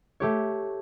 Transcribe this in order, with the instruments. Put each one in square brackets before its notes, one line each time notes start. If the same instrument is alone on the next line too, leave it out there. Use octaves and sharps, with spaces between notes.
[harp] A3 G4 C#5